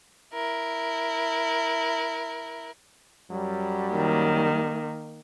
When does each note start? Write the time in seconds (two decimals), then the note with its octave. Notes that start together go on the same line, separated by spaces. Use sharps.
0.34 E4 A#4
3.30 F#2 F#3 G3
3.93 D#3 A#3